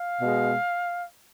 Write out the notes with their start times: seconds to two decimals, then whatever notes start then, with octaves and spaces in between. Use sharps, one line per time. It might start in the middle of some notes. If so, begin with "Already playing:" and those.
Already playing: F5
0.21 B2 G#3